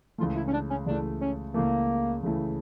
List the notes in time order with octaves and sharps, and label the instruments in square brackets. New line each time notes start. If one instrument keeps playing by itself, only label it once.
[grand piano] C#2 C#3 E3 A3 [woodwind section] F4
[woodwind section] E4
C#4
D4
C#4
[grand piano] C#2 C#3 E3 A3 [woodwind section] D4
[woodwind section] C#4
[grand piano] C#2 C#3 E3 A3 [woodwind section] A#3
[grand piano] C#2 C#3 E3 A3